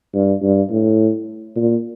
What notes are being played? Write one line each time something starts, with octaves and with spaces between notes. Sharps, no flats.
G2
G2
A2
A#2